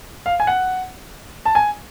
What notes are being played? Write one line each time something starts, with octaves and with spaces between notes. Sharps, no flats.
F5
G#5
F#5
A5
G#5